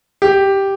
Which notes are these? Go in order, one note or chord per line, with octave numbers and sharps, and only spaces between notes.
G4